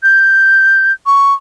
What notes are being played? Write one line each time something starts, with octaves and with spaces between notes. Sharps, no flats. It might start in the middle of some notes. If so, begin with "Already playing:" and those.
G6
C#6